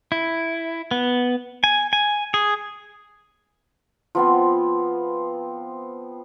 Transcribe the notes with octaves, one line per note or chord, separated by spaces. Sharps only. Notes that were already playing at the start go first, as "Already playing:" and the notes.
E4
B3
G#5
G#5
G#4
F3 B3 C4